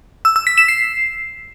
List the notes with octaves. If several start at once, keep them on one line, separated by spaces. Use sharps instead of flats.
E6
E6
B6
E7
C7